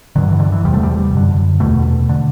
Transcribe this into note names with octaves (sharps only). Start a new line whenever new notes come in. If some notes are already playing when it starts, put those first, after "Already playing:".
G2 D3 F#3
E3
D3
E3
E2 C3 G3
A3
G3
F#2 D3
E2 B2 A3
D3